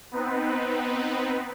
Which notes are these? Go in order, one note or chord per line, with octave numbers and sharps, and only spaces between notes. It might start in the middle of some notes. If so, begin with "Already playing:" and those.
B3 C4 D#4 B4